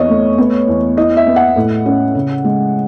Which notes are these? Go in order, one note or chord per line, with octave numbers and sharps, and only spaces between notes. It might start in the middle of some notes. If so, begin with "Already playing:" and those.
Already playing: E2 C#5 D#5
A3
B3
E2
E4 D#5
E5
B3
F#5
A2
C#4
C#3
G#3